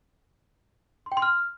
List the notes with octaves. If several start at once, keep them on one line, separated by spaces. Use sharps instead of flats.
C6
G5
C6
F6